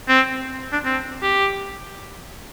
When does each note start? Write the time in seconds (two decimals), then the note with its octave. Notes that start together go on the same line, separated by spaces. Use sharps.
0.09 C4
0.73 D4
0.85 C4
1.23 G4